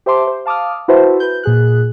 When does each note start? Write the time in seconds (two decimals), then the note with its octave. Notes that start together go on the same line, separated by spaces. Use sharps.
0.06 G4 C5 E5 A5 C6 D6
0.27 C5
0.45 F5 A5 D6 D#6 F6
0.88 E4 F#4 B4 C5 E5 A5
1.20 B4 G6
1.43 A#2 G#4 F#6